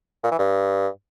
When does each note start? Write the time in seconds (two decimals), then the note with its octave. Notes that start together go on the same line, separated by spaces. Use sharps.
0.23 A#2
0.31 E3
0.39 G2